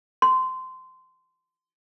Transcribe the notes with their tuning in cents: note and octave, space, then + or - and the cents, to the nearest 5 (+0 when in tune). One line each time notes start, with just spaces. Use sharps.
C6 -20